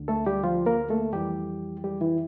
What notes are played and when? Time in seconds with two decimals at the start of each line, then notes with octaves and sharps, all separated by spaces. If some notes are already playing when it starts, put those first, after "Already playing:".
Already playing: D2 D3
0.08 A3 A4
0.26 G3 G4
0.44 F3 F4
0.66 A#3 A#4
0.90 A3 A4
1.13 F2 E3 G3 G4
1.84 G3 G4
2.01 E3 E4